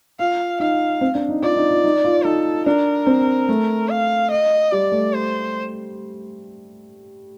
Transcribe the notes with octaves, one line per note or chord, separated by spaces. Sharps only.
F4 F5
D#4 F5
C4
D4
D#4
F4 D5
D#4
F4
D#4
F4
D#4 A4
D4 A#4
C4
A3
F5
D#5
G3 D5
A3
C5